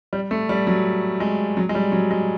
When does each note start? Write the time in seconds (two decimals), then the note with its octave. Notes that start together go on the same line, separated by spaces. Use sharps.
0.13 G3
0.31 A3
0.49 G3
0.67 F#3
1.20 G#3
1.57 F#3
1.69 G#3
1.75 G3
1.92 F#3
2.11 G#3